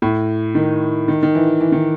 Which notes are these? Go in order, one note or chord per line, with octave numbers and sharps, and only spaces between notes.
A2
D#3
D#3
D#3
E3
E3
D#3